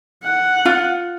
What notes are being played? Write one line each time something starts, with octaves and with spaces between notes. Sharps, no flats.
F#5
F4